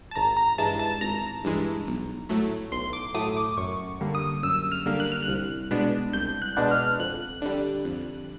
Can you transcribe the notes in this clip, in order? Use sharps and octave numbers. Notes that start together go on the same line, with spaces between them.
A5
G#1 A#5
A#5
G2 E3 G#3 A5
A5
G#1 A#5
G2 E3 G#3
B1
A2 F#3 A3
B1 C6
D6
A2 F#3 A3 D#6
D6
F#2 C#6
D3 G3 A#3
D#6
F#2 E6
F6
D3 G3 A#3
F#6
F6
F#6
C2
B2 G#3 B3 D4
C2 G6
F#6
B2 G#3 B3 D4
F6
F2 F#6
D3 G3
F2